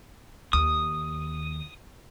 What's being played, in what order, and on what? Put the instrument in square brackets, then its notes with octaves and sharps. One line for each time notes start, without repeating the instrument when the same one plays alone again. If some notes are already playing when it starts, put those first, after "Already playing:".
[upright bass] D#2 [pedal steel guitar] D#6